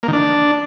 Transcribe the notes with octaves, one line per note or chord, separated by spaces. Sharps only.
A#3
D#3
D4